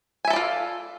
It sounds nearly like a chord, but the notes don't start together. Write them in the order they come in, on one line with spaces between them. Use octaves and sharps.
G#5 E5 A4 D5 F4